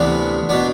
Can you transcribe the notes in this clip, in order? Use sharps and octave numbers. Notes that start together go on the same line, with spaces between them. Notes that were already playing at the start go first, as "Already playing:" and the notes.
Already playing: D2 C3 E3 B3 D4
B2 B3 D4